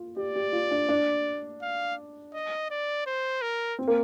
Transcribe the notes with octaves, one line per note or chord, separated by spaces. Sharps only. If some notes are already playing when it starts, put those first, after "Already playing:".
Already playing: F4
G4 D5
G4
F4
D4
D4
F5
D#5
D5
C5
A#4
C4
A#3